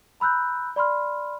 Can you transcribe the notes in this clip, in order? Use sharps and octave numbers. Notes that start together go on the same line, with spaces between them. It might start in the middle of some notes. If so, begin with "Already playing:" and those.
A#5 B5 E6 F#6 G6
D5 B5 C6 F6